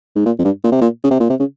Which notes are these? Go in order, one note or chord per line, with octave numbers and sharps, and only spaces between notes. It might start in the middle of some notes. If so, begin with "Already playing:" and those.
G#2
A#2
F2
G2
A#2
C3
A#2
C#3
C3
A#2
C3
C#3